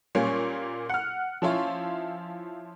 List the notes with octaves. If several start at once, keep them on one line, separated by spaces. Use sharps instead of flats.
A#2 G3 A#3 C#4
F#5 F6
F3 C#4 E4 F4